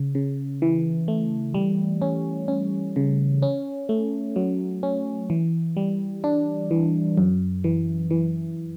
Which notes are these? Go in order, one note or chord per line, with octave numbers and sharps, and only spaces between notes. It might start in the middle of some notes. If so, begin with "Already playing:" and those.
Already playing: C#3
C#3
E3
A3
G3
C#4
C#4
C#3
C#4
A3
F#3
C#4
E3
G3
D4
E3
F#2
E3
E3